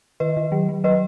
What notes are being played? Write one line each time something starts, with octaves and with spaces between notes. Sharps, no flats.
D#3 B4 D#5
D#3
F#3
F#3
F#3 B4 D#5